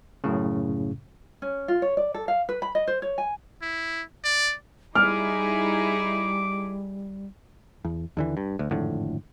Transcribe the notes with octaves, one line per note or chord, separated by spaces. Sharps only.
F#2 A2 C#3
C#4
F4
C#5
D5
A4
F5
B4
B5
D#5
C5
C#5
G#5
E4
D5
G3 D#4 E4 G#4 D6 F6
E2
D#2 D3 E3
G2
D2
G#1 F2 A2 D3